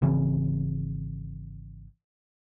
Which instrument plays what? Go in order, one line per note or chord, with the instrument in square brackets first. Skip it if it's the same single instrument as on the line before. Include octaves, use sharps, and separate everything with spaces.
[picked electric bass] G#1 C#3 E3 C4